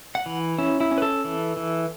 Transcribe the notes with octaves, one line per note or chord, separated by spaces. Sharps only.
F#5
E3
C#4 E4
E4
C#4
B4
A4
E3
E3